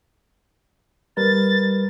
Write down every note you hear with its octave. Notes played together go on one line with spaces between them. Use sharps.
G3 A#4 B4 A6